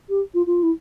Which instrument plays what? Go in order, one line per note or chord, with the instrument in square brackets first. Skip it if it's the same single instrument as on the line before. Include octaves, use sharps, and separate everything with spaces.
[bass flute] G4
F4
F4
E4